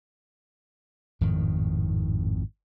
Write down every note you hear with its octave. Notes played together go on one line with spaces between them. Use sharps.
G#1 F2 A2 D#3